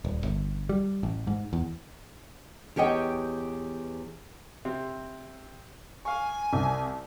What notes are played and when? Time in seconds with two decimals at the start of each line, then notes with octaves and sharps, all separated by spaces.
0.05 D#1
0.24 G1
0.69 G3
1.03 A1
1.27 G#2
1.53 E2
2.76 E2 G4 C#5 D#5 G5
4.65 C3 C4
6.05 F5 G#5 C#6
6.53 C2